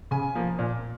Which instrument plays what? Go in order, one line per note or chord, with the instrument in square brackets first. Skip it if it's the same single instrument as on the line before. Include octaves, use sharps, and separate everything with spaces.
[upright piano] C#3 G#5
F3 A#3
A#2